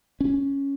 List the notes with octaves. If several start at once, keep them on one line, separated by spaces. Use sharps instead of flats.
C#4